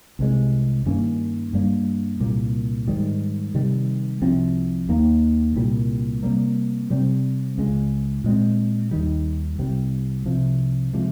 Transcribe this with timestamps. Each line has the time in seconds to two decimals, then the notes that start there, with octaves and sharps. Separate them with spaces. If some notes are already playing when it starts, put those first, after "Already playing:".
0.19 C2 C3 D#3 G#3
0.86 G2 D#3 A#3 C#4
1.53 G2 G3 A#3
2.20 C2 A#2 G3 A#3
2.88 G#2 D#3 G3
3.54 C3 D#3 G3
4.21 C2 C3 F3 C4
4.89 D#2 D#3 A#3
5.56 C2 A#2 G3
6.23 C3 G3 A#3
6.90 C3 G3 C4
7.58 C#2 C#3 G#3
8.24 A#2 G#3 C4
8.91 D#2 D#3 G3
9.59 C2 C3 G3
10.26 C2 C3 F3
10.93 C3 F3 G#3